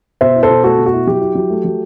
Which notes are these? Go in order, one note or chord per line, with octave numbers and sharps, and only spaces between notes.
B2 C5 E5
E4
A4 C5
B2
A3 F#4 A4
B2
F#4
E4
F#3 G4
E4
F#3
A3
F#3